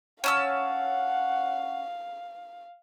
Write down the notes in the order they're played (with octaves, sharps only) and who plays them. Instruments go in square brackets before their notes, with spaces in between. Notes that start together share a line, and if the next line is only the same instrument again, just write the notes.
[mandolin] C#4 A5 E6 [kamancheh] F5 [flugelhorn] F#5